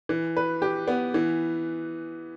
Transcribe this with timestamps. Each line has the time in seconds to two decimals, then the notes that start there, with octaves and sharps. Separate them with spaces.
0.09 E3
0.37 B4
0.62 G4
0.88 B3
1.14 E3